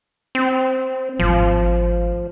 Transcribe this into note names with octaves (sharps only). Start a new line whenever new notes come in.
C4
G#1 A2 F3